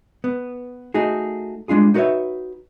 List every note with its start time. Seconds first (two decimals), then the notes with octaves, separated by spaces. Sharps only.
0.24 B3
0.94 A3 D#4 F#4 G#4
1.68 G3 G#3 D4 F4 G#4
1.94 D#4 F#4 A#4 B4 C#5 E5